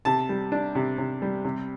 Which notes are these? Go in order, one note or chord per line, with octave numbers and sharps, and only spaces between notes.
C3 A5
G3
D4
C3
C3
G3
C3